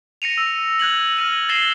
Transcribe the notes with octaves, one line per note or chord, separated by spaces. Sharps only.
A#6 C#7 D#7 F7
E6
F#6 G#6 A#6 F#7
F6 A#6 D#7 F#7
A6 A#6 C7 E7 G7